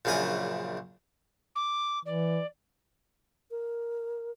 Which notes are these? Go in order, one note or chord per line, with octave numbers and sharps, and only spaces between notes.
A#1 F#2 C#3 D4 G#5 A#5
D6
E3 D5
A#4